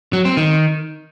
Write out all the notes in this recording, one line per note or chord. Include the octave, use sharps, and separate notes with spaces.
F#3
C4
D#3